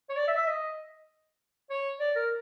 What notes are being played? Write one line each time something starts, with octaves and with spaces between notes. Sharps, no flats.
C#5
D5
E5
E5
D#5
C#5
D5
A#4